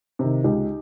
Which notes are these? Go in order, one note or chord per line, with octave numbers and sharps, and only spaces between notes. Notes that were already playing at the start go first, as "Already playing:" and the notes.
C3 D#3
C#2 D#4 G4